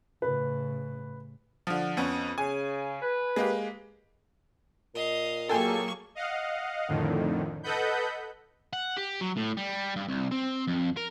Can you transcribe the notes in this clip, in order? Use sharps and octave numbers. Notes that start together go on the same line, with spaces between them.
A2 C#3 B4
D3 F3
F2 B3 C#4
C#3 G#5
B4
G#3 A#3 G4
A#2 D#5 F5
F#3 A#3 G#4 A4 G5 G#5 C#6
D#5 F5 F#5
F2 A2 D3 D#3
A4 B4 D#5 F#5 B5 G6
F#5
G4
F#3
A2
G3
G2
C2
C4
F2
A#4